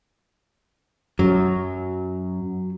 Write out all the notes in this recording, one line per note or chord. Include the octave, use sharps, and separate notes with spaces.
F#2 F#3